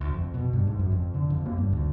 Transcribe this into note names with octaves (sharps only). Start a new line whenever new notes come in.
D2
F2
B2
G2
G#2
F#2
F2
D3
F2
A#3
G2
D2